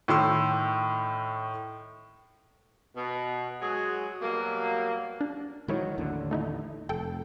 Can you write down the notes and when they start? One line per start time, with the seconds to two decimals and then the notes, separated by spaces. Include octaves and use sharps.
0.08 A2 D#3 C6 E6
2.96 B2
3.62 F#3 G#3 F#4 G#4
4.22 B2 F#3 G3 A#3
5.21 D4
5.68 D#3 F#3 G#3 E4 C#5
5.98 A1 D#2 D3
6.31 A3 D#4 E4
6.89 F1 A4 G5